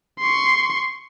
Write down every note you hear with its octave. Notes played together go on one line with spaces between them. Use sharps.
C6 C#6